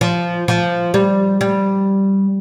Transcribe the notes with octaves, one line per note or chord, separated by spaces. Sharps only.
F3
F3
G3
G3